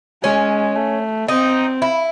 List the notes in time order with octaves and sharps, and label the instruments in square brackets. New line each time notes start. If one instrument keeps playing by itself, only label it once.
[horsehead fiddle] G#3 [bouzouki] C#4
[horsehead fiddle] A3
[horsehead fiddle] C4 [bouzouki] D#4
[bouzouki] E4